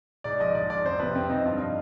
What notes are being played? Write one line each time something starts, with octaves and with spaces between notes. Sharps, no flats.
G#2 D5
F3 D#5
G#2 D5
F3 D5
F2 C5
C3 F3 B4
F2 C4
C3 F3 D#4
G2 F4
F3 D#4